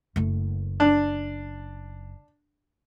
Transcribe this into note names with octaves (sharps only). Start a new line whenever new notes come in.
F#1 A3
D4